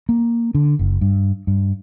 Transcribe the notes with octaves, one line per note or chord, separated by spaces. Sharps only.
A#3
D3
F#1
G2
G2